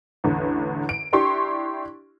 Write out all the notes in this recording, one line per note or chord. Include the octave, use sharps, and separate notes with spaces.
A1 E2 D3
D7
D4 E4 G4 C6 C#6